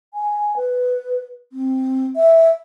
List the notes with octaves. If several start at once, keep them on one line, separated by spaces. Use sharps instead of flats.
G#5
B4
C4
E5